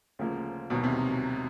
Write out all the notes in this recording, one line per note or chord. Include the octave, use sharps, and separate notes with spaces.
D2 C#3 F3 A#3
E1 D#2 B2 D#3 F#3
C3